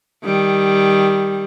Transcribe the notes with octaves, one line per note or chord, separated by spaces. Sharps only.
D#3 G3